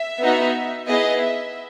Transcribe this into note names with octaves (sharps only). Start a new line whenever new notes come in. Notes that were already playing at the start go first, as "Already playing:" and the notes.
Already playing: E5
B3 D#4 F#4
B3 E4 G#4 D#5
E5